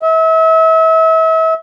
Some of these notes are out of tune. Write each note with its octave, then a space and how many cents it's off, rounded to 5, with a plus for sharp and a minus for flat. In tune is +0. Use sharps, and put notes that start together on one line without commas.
E5 -35